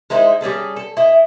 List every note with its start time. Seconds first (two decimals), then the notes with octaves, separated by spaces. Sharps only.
0.10 G#3 D#4 E4 C5
0.41 G3 C#4 G#4 A4
0.76 A4
0.97 E4 D#5